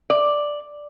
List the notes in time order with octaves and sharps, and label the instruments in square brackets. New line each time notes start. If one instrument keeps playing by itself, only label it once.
[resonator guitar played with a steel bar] D5